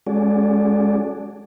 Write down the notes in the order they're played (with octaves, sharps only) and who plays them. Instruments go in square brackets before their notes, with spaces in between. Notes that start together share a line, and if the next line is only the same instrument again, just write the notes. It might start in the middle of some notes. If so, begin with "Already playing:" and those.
[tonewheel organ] G#3 C#4 F#4 G#4 A4 D5